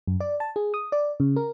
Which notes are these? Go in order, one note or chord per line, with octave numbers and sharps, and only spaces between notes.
F#2
D5
A5
G#4
D#6
D5
C#3
A#4